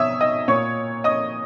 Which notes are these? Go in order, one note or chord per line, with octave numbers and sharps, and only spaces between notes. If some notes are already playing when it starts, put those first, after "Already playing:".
Already playing: B2 C#5 E5 D#6 E6
D#5 D#6
A#2 C#5 C#6
D#5 D#6